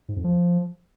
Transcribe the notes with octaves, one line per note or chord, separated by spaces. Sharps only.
G#2
F2
F3